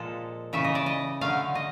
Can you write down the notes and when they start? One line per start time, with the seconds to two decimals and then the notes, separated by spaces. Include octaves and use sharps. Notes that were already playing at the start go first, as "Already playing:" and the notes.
Already playing: A#2 F3 G#3 A4
0.53 C#3 E3 A3 E5
0.64 D#5
0.75 D5
0.86 D#5
1.21 D3 F#3 A3 F5
1.55 D#5